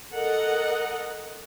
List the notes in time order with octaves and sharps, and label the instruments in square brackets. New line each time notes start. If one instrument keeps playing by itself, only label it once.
[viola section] A4 A#4 D#5 F#5